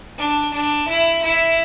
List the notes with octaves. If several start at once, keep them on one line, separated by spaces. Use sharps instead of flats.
D4
D4
E4
E4